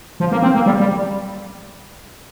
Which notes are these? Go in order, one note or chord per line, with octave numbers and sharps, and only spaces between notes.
F3
A#3
C4
A#3
G3
G3